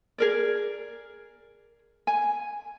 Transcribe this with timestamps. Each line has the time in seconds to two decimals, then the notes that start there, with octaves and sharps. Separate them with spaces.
0.18 G#4 A#4 D5
2.07 G#5